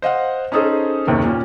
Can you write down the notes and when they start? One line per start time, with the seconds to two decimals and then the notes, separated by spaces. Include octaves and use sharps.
0.02 C5 D#5 F5 F#5
0.52 C#4 D#4 G#4 A4 C5 D#5
1.07 F#1 D#2 C3 D#3
1.25 A#2 C#4